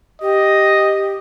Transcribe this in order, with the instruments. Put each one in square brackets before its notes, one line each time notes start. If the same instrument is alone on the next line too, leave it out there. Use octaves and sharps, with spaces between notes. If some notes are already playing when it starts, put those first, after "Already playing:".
[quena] G4 [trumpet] D#5